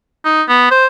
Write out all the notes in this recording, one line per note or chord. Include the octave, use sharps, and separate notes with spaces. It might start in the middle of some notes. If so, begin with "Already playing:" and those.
D#4
B3
C5